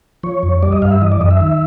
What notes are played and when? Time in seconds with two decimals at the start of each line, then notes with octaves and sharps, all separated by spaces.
0.23 F3 C#5
0.43 F2
0.63 G3 D5
0.72 D#5
0.82 G2 F5
0.92 E5
1.01 E3 D#5
1.12 D5
1.21 F#2 D#5
1.31 E5
1.41 D#3